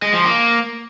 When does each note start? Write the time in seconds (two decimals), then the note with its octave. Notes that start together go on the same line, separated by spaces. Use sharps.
0.02 G#3
0.13 F3
0.25 A#3